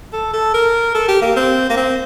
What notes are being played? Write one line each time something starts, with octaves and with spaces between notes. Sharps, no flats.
A4
A4
A#4
A4
G4
A#3
C4
A#3
C4